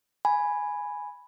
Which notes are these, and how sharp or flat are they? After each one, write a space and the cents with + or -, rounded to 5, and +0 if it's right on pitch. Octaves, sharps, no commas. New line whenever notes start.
G#5 +0 B5 +0